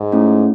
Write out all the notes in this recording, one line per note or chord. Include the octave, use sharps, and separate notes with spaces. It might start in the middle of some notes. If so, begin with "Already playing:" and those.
Already playing: G#2
A3 C#4 E4